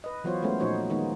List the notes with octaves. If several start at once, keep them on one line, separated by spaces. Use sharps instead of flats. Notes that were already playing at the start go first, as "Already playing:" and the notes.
B4 D#5
E3 F#3 B3 F4 C5 C#5
G#3 A3 B3 C#4 C5
A#2 F3 D#4 F#4 C5 C#5
D#3 G#3 A#3 B3 D#4